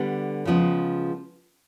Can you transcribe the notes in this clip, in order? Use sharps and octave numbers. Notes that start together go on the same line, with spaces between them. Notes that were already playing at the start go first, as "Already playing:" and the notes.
Already playing: D3 G3 B3
C#3 F3 G#3 B3